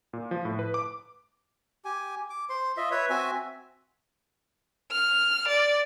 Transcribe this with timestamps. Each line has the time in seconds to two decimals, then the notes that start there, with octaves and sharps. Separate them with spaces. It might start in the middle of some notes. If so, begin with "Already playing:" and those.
0.13 A#2
0.31 F3
0.45 A2
0.59 B4
0.74 D6
1.85 G4 G#5
2.30 D6
2.49 C5 C6
2.77 F4 D#5 E5
2.91 B4 C#5 E5
3.10 C4 F#4 E5 G#5
4.92 F6
5.48 D5